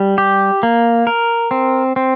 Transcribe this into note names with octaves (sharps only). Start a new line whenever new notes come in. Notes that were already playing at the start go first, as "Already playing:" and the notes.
Already playing: G3
G4
A#3
A#4
C4
C4